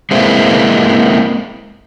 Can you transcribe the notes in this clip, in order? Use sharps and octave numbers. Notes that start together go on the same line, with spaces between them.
G#3 A#3 C4 E4